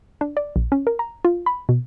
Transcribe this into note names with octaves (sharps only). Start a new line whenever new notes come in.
D4
D5
A#1
C#4
A#4
A#5
F4
B5
B2